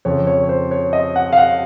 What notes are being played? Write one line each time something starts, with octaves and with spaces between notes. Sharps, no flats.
F2 C#3 C#5
C#5
C#5
C5
C#5
D#5
F#5
F5
F#5